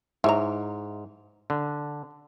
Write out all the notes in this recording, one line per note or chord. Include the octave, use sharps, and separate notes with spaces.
G#2 E4 C#5 A#5
D3